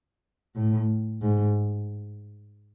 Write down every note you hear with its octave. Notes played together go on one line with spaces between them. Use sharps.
A2
G#2